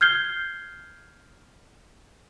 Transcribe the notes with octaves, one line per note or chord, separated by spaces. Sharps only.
F6 G6 G#6 C7 G7